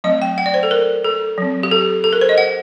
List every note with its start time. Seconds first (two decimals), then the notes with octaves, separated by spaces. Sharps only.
0.04 F#3 A3 C4 D#5
0.22 G5
0.38 F#5
0.46 D5
0.54 C5
0.63 A4
0.71 A#4
1.04 A4
1.38 F#3 C4
1.63 G4
1.72 A4
2.04 A4
2.13 A#4
2.21 C5
2.29 D#5
2.38 F#5